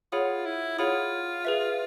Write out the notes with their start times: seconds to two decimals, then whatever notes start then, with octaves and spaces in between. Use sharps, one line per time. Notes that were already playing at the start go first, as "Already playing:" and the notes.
0.12 F4 G#4 C#5 F#5 B5 D#6
0.46 E4
0.78 F4 G#4 C#5 F#5 B5 D#6
1.45 G#4 B4 E5